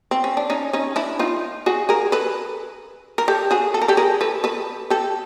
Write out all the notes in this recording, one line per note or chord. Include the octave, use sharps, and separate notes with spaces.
C4
C#4
D4
C#4 D#4
C#4 D#4
D4 E4
D#4 F4
F#4 G#4
G#4 A#4
A4 B4
A#4
G4 A4
F#4 G#4
A4
A#4
G4 A4
G#4 A#4
A4 B4
A4 B4
G4 A4